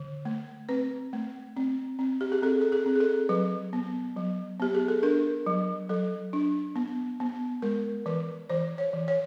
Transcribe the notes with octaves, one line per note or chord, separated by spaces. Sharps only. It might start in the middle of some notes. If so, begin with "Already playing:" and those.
Already playing: D3
A3
C4 B4
A3
C4
C4
G4
G#4
C4 A4
A4
G#4
C4
G#4
A4
F#3 B4
B3
F#3
B3 G4
G#4
A4
D4 A#4
F#3
F#3 A4
D4
B3
B3
G#3 A#4
E3 B4
E3 C5
C#5
E3
C#5